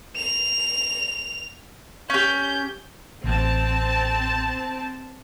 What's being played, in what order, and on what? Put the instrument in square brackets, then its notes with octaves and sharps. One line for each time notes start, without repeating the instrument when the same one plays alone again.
[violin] F7
[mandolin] C#4 G4 [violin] G6
[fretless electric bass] A1 [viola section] C4 A5